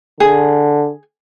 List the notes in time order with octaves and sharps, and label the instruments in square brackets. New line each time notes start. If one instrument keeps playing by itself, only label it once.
[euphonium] D3 [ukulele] G#4